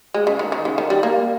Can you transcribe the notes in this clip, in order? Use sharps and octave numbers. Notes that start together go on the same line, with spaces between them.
G#3
C#3
D#3
D#3
C#3
D#3
G3
A#3